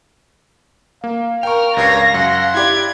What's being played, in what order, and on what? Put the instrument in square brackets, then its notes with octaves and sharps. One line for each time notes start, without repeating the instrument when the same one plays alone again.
[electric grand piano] A#3 [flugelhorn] F5
[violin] A#4 F6 [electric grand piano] G5 C#6
[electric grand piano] C#2 C7 [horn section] G2 C#5 [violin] A#6
[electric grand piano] F#2 [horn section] F#5 C6
[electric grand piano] E4 G4 D5 [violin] G#6